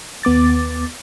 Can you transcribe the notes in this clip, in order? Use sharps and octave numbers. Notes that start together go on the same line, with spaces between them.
D#2 B3 D6 A6